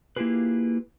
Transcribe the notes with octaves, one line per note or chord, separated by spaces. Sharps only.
A#3 E4 F4 G4 G#4 B4